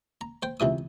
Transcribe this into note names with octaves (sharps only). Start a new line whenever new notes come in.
A#5
C5 G5
C#2 C3 E3 D#6